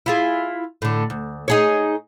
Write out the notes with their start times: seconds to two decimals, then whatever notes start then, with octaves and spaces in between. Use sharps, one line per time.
0.06 E4 F4 G#4
0.82 A2 D3
1.10 D2
1.48 D#4 G#4 C#5